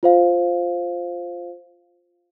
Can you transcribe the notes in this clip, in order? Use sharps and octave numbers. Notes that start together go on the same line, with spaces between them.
F4 C5 F5